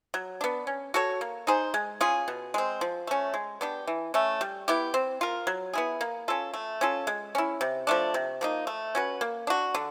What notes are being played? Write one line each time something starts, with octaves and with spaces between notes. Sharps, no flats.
F#3
B3 D4
C#4
F#4 A4 C#5
A#3
D#4 G#4 C5
G#3
C#4 F4 G#4
B2
G#3 C4
F3
A3 C#4
G#3
B3 D4 G4
E3
A3 C#4
G3
B3 E4 G4
C4
F4 A#4
F#3
B3 E4 G#4
A#3
C#4 F4 A4
A3
C#4 F4 A4
G#3
C#4 E4
C3
F3 A3 D4
C3
F3 A#3 D#4
A3
C#4 F#4 B4
A#3
D4 F#4
D3